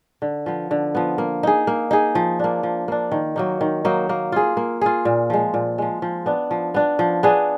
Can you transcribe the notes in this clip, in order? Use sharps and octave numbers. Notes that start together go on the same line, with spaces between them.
D3
F3 B3
D3
F3 B3
A#3
D#4 G#4
A#3
D#4 G#4
F3
A#3 D4
F3
A#3 D4
D#3
F#3 A#3 D#4
D#3
F#3 A#3 D#4
A#3
F4 G#4
A#3
F4 G#4
A#2
F3 G#3
A#2
F3 G#3
F3
B3 D4
F3
B3 D4
F3
B3 D4 G#4